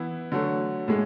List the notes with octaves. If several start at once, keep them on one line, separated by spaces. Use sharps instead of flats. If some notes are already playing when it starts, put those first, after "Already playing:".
Already playing: E3 B3 E4
D3 F#3 A3
A2 G#3